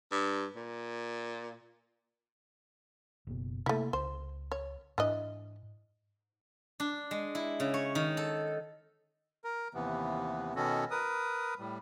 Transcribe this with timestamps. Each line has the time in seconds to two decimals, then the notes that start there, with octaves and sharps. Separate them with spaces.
0.12 G2
0.56 A#2
3.27 F#1 B2
3.66 C3 A3 A#3 E4
3.93 C#2 C5
4.52 C#5
4.98 G#2 E3 D4 D#5
6.80 D4
7.11 G#3
7.35 E4
7.60 C#3
7.74 C#5
7.95 D#3
8.17 A4
9.44 A#4
9.74 D#2 C3 E3 B3
10.56 B2 D#3 B3 C#4 F#4 A4
10.91 A#4 B4 D#6
11.59 A2 G3